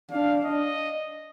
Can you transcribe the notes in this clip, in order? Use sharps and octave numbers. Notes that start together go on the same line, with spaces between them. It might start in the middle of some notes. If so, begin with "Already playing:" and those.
D4 F5
D#5